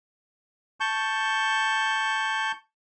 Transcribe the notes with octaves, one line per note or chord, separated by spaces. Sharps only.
A5 C#6 G6